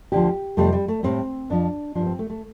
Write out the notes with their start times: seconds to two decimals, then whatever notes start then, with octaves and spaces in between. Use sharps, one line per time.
0.12 D2 D3 F3 G4
0.57 F2 C3 G3 A3
0.72 G3
0.88 A3
1.03 A2 G3 C4
1.50 F2 F3 D4
1.95 G2 F3 D4
2.06 C4
2.19 A3
2.30 A3